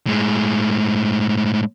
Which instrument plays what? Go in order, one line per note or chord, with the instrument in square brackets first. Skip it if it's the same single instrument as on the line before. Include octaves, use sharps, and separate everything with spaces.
[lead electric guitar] A2 G#3